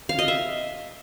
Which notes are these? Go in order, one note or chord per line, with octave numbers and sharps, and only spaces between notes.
F5
D#5
E5